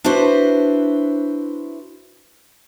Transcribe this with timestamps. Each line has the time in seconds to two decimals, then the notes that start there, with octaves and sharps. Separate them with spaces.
0.04 D4 E4 F#4 B4 C5